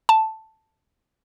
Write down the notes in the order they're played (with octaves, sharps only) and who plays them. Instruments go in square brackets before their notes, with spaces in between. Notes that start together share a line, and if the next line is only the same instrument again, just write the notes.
[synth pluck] A5